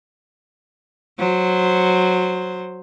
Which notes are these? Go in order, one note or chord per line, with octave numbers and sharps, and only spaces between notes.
F#3 C5